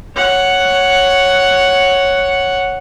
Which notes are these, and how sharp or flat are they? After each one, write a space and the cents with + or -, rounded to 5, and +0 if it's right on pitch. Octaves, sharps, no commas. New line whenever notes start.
C#5 +0 F#5 +0